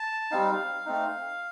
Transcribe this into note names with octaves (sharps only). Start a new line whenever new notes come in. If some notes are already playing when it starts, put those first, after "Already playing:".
Already playing: A5
G3 C4 D#4 F5
A3 C4 D#4